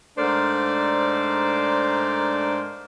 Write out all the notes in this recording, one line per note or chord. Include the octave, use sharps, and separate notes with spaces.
G#2 A3 D4 A#4 C5 D5